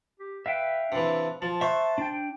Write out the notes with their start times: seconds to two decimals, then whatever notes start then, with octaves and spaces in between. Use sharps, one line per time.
0.20 G4
0.46 B4 E5 F5 G5
0.92 C3 E3 D4
1.42 F3 A5
1.61 C5 E5 C#6 F#6
1.98 D4 G5